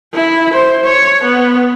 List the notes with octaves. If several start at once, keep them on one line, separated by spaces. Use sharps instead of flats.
E4
C5
C#5
B3